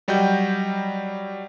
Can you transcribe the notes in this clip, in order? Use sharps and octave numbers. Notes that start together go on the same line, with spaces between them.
F#3 G3 F#4 D#5 G5 G6